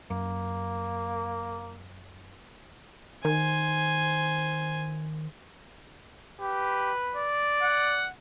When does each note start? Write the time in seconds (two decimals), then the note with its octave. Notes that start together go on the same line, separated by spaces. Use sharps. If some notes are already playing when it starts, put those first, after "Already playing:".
0.10 F#2 A#3
3.25 D#3 C5 G#5
6.40 G4 B4
7.16 D5
7.62 F#5